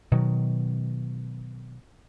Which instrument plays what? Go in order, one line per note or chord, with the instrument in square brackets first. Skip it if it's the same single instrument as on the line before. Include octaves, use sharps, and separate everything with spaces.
[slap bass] B2 D#3 F#3